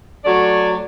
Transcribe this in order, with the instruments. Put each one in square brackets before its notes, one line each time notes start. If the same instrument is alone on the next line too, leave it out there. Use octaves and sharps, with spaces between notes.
[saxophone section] F#3 A3 F#4 D5